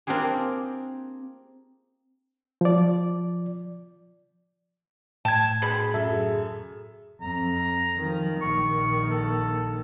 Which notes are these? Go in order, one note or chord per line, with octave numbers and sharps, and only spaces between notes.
A#3 C4 D4 F4 G4 G#4
F3 D5
A2 G5 A5 G#6
B2 D3 G#4 B5
F#2 A4 E5
F2 A#5
D#3 F3
A#1 D#3 C#6
A4